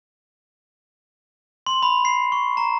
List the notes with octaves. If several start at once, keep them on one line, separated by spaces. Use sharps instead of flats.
C6
B5
C7
C#6
A#5